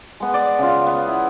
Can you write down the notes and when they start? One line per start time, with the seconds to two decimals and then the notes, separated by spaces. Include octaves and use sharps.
0.20 G#3 B3
0.34 D5
0.59 C#3 F4
0.87 B3
1.07 E4